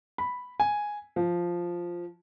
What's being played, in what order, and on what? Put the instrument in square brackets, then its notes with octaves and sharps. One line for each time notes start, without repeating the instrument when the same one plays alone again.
[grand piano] B5
G#5
F3